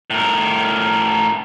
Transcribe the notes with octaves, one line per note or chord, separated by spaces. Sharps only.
A2 A#4